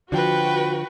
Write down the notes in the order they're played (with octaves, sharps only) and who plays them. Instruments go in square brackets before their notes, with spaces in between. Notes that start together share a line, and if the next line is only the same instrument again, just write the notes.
[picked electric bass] D3 F3 [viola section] F#4 [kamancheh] B4 G5